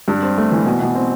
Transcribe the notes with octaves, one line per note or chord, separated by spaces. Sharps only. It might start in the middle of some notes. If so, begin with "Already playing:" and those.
G2
C4
A3
E3
B2
B2
C4